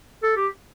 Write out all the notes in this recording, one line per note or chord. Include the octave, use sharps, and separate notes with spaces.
A4
G4